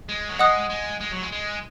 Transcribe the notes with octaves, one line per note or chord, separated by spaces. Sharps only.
G#3
F#3
G#3 D#5 F#5 D#6 F#6
G#3
G#3
F#3
G#3
G#3